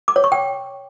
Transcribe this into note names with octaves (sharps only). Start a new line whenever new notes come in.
D6
C#5
C#6
G5